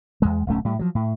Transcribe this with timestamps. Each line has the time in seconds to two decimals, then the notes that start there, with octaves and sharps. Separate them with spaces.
0.22 E2 G#3
0.47 D1 B1 A3 C#4
0.65 A2 G3
0.79 F3 F#3
0.95 A2